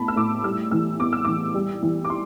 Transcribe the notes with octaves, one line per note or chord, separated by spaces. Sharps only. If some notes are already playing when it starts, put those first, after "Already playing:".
Already playing: A2 B3 A5 B5
E6
A2 D6
G3 E6
E3 E6
B3 D6
E6
E3 D6
G3
E3
D6
C6